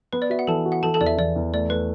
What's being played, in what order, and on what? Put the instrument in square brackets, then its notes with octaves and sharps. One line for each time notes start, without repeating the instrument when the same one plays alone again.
[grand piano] B3 [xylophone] B4
[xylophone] D5
[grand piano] F#4 [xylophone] E5
[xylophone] F#5
[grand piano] E3 [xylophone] A4 A5
[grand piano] F#4
[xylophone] F#5
[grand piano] E3 [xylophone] A4 A5
[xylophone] A4 A5
[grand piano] E2 [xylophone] D5
[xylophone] E5
[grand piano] E2 [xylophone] D5
[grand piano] E2
[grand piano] A3 [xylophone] D5
[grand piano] A3 [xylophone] B4